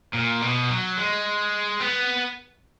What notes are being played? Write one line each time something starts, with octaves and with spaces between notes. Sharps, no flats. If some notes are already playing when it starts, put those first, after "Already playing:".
A#2
B2
F#3
G#3
B3